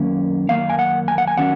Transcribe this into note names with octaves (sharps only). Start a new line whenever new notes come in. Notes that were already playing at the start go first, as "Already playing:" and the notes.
Already playing: F#2 D#3 A#3 C#4
F#2 D#3 A#3 F5
G#5
F#5
G#5
F#5
G#5
D#3 F#3 C#4 F#5